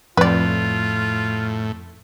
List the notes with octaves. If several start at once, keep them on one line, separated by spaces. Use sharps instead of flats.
F2 A2 F4 B4 D5